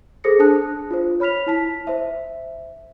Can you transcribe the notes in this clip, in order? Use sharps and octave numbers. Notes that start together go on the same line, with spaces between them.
G#4 A4 C5 D#6 A#6 C#7
D4 C5 A5 D#6 F#6
F4 C5
C#5 B5 F6 B6 F7
E4 A5 B6
C5 E5